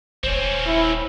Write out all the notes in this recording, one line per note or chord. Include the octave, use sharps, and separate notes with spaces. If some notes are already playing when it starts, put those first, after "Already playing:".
D#1 C4 C#4 C5 C#5
E4